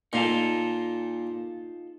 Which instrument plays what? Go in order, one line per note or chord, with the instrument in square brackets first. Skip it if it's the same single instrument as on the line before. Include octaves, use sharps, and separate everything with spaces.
[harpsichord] A#2 [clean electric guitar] D#4 F4 A4